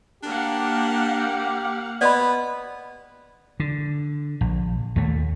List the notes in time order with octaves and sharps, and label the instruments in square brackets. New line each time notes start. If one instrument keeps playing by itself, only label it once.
[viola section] A#3 F5 F#5 [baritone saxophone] D4 [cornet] G4
[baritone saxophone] B3 [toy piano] D5 D#5 B5
[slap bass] D3
A#1
D#2 A3